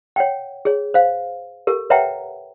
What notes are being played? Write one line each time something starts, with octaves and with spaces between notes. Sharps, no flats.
C#5 F#5 G5
G#4 C#5
C5 F5
G4 A4 A#4
B4 C#5 E5 F#5 G5 A#5